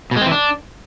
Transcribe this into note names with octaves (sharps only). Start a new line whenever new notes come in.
B2
G#3
C4
E3
D4